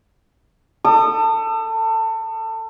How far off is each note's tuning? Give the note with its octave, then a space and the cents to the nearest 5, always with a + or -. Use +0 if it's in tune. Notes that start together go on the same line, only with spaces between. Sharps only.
A4 +25 D#6 -30